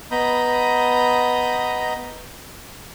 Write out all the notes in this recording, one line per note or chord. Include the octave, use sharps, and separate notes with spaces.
B3 D#5 A#5 B5 D#6 G6